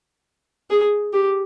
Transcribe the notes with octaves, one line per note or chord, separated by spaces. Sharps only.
G#4
G4